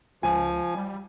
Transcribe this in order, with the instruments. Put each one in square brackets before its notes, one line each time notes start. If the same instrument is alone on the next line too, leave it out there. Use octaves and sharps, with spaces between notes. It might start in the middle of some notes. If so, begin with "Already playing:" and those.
[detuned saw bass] C#2 [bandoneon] F3 [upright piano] G#5
[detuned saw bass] G3